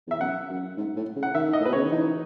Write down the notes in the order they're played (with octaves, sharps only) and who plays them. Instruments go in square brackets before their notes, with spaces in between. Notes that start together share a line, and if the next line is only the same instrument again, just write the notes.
[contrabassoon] E2 [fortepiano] E5
[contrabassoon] F#2 [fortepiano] F#5
[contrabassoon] F#2
G#2
A2
C#3
[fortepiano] F#5
[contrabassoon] D#3 [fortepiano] E5
[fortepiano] D#5
[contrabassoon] A2
[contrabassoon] B2 [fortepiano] B4
[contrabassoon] C#3 [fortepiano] C#5
[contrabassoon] D#3
[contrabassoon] E3 [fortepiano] D#4